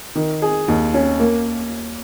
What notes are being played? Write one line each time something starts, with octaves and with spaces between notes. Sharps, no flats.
D#3
G#4
D#2
C#4
A#3